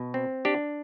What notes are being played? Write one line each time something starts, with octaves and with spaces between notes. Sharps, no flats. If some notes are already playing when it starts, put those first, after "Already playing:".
Already playing: B2
C4
D4 G4